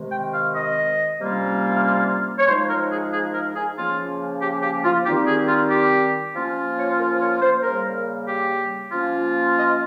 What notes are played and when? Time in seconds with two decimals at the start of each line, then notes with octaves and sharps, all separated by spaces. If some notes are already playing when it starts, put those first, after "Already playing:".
Already playing: C3 D#3 G#3
0.12 G5
0.34 F5
0.55 D#5
1.19 C3 G3 A#3 C#4 F4
2.39 C#5
2.48 F3 G#3 D#4 C5
2.70 A#4
2.92 G#4
3.13 G#4
3.34 A#4
3.56 G#4
3.77 C#3 F3 A#3 C#4 F4
4.41 G4
4.63 G4
4.85 F4
5.06 D#3 G3 C4 D#4 G4
5.27 G#4
5.48 F4
5.71 G4
6.34 F3 A#3 C#4 F4
6.78 C#5
6.89 C5
6.99 A#4
7.20 C#5
7.42 C5
7.63 C#3 G3 A#3 A#4
8.28 G4
8.92 F3 A#3 C#4 F4
9.57 D#5